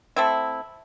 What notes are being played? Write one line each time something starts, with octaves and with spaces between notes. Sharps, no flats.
A3 C4 E4